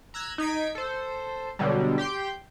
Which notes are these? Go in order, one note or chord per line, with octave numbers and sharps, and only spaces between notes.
A#5 E6 F#6 G#6
D#4 G#6 B6 D7
A4 C5
B2 D3 F#3 G3
G4 G5 C6 G6